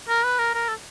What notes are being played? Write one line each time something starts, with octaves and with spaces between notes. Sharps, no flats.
A#4
B4
A#4
A#4
A4